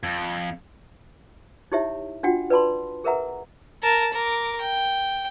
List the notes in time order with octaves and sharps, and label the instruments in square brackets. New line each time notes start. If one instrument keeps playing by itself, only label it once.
[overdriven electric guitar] F2
[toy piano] D#4 E4 G4 C#5 E5
D4 F4 F#4 F#5 G5
B4 D5 A5 B5 C6
G#4 A#4 B4 E5 F#5 A#5
[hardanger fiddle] A#4 A5
A#4 D6
G5